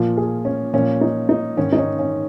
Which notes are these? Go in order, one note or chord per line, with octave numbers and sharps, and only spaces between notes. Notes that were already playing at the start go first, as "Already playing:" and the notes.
Already playing: A#2 F3 F4
G#4
C#4
A#2 F3 C#4
D#4
D#4
G#2 D#3 C#4
D#4
C#4
C#4